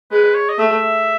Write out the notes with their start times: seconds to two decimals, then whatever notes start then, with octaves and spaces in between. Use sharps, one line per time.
0.11 G#3 B4
0.34 C#5
0.49 D#5
0.58 A3 E5